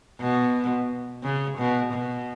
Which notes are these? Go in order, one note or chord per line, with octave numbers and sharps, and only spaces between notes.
B2
C#3
B2
B2